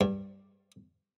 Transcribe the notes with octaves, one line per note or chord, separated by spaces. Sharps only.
G2